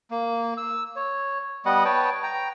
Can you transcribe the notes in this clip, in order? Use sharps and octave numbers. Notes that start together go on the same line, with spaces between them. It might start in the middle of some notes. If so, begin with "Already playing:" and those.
A#3
E6
C#5
G3 B3 D#5 F#5
B4 C#5 G5 A5
G5 A#5